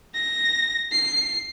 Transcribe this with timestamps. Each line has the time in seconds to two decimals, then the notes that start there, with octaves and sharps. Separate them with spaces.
0.14 A#6
0.91 C7